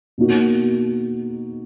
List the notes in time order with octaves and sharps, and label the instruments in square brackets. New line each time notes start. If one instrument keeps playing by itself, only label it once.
[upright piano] B2 A#3 D#4 F#4